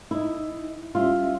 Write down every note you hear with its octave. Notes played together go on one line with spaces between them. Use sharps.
D#4 E4 D#5
G3 C#4 F4 E5